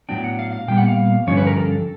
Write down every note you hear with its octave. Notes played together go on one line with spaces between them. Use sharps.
A2 F#3 B3 D4 G5
F#5
F5
F5
A#2 G3 B3 G5
F#5
F5
G2 D3 F3 C#4 C#5
B4
A#4
A4